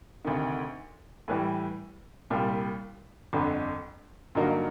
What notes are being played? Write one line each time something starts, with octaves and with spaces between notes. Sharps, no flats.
D2 C3 D#3
A2 E3 G3
C2 A#2 G3
G1 F2 D3
G2 D3 F#3 A#3 D#4